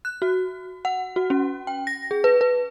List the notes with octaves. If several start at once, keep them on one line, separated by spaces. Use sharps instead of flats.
F#6
F#4
F#5
F#4
C#4
G5
A#6
G#4
B4
B4